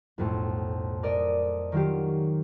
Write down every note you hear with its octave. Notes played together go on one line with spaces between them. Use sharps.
B1 F2 A2
A#4 D5 D#5
D#3 F#3 F4 G4